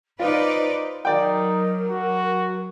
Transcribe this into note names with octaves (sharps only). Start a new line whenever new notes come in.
D#4 F4 B4 C5 D5
F#3 D#4 A#4 D5 G5
F#4